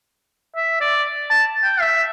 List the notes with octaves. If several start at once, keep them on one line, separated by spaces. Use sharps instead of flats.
E5
D5
A5
G5
E5